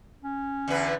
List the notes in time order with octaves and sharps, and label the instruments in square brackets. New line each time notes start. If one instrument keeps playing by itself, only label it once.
[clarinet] C#4
[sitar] E2 D3 B4